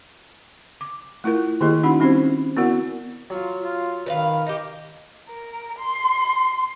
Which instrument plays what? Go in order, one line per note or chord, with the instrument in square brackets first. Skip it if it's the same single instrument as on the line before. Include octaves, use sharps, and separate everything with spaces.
[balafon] D6
A3 E4 F4 A#4
D#3 A#3 E4 G4 G#4 D#5
C#4 D#4 F#4 F#5 B5
G3 C4 C#4 E4 G4 C5
B3 E4 F#4 A#4 D5 F#5
[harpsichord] F#3 [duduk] F4
[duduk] F4
[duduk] D#3 [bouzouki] B4 D5 F5
[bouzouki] D#4 G4
[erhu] A#4
C6